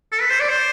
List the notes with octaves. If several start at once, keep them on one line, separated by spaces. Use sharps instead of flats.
A4
B4
C5
D5
C5